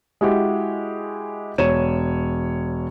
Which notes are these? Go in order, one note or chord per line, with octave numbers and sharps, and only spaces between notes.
G#3 E4 F#4 G4
E1 C#5 D#7 E7